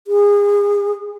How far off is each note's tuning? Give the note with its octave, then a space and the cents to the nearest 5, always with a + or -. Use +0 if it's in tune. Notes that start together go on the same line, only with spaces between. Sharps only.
G#4 -30